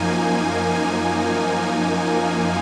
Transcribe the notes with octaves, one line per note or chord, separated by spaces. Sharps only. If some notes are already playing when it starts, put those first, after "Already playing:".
Already playing: F#2 F3 A#3 D#4 G#5
G#5